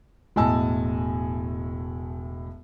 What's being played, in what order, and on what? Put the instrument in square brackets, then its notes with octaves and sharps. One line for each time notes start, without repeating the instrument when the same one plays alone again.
[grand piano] E1 A2 D#5 G#5 A5 E6